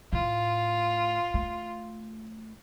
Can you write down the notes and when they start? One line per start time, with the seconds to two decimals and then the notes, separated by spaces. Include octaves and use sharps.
0.13 A2 F4
1.34 A3